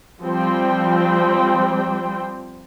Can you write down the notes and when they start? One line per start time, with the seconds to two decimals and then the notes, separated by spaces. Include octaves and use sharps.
0.22 F3 G3 C4 C5 G5